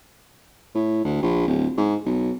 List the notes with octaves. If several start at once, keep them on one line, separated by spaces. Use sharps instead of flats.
A2
D2
A#1
D1
G#2
B1